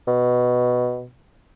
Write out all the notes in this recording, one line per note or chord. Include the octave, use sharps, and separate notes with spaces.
B2